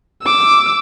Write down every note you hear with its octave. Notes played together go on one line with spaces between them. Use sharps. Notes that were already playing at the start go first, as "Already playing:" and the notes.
D6 E6